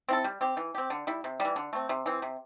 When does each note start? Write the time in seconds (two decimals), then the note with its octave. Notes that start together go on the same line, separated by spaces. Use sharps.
0.09 C4 E4 A4
0.24 G3
0.41 C4 G4
0.57 E3
0.75 C4 G4
0.90 D3
1.07 G3 E4
1.24 C3
1.40 G3
1.45 E3
1.56 D3
1.73 A3 C4
1.89 C3
2.06 E3 C4
2.22 C3